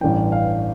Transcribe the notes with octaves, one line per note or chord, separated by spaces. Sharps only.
A1 G2 E3 G5
F5